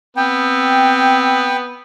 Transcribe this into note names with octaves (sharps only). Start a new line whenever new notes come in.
B3 C4 G5